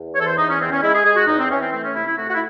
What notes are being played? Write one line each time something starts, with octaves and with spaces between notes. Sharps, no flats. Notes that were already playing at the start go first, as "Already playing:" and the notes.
Already playing: E2
E3 C#5
A4
C5
E2 D#4
C#4
E2 C4
C#4
G#3 E4
G#4
G#3 G#4
F#4
E2 D#4
C4
E3 C#4
C4
A3 C4
C#4
C3 E4
E4
A3 F#4
F#4
E4